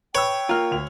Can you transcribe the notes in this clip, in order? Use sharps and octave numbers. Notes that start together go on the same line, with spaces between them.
B4 C#5 G5 E6
A#3 F4 A#5 F6
D2 F7